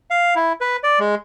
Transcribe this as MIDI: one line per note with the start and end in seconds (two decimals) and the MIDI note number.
0.11 0.34 77
0.36 0.53 64
0.61 0.77 71
0.84 0.99 74
0.99 1.15 56